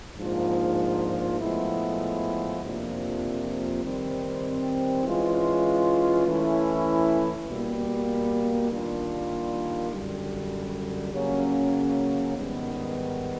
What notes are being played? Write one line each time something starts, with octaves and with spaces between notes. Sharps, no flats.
G#2 F3 A#3 D4 F4
A2 F3 G#3 B3 E4
F2 C3 F3 A#3 D4
D#3 G3 C4
E3 G#3 C#4 F4
E3 A3 C#4 E4
B2 G3 A#3
D#3 G3 A#3 D4 F4
F#2 D3 G3
C#3 F#3 A#3 C#4
G#2 D#3 G3 B3